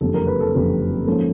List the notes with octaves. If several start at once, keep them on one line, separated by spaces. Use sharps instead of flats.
F#1 F2 D3 G3 A4
A#4
B4
A4
F#1 F2 D3 G3 A4
G#2 F3 A#3 C#4 A4